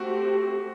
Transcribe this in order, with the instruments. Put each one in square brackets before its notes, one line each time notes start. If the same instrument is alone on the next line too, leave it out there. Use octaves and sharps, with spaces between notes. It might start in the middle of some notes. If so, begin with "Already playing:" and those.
Already playing: [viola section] A3 C4 G4 [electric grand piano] F#4